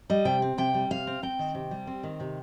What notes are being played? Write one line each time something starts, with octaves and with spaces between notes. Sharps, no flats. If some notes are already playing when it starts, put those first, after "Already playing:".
G3 D#5
C3 G5
C4
C3 G5
G3
C3 F5
C4
C4 G5
D#3
C3
G3
C4
D#3
C3